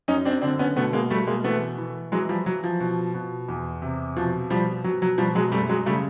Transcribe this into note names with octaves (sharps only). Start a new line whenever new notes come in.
F#2 C#4 D#4
C4 D4
D3 C4 D4
B3 C#4
B2 A3 B3
G#3 A#3
B2 G3 A3
G#3 A#3
E3 A3 B3
E3
E3 F#3 G#3
F3 G3
E3 F#3
F3
B2
B2
E2
C3
B2 F3
B2 F3 G3
B2 F#3
F#3
B2 F3 G3
F#3 G#3
F#2 G3 A3
F#3 G#3
C#3 G3 A3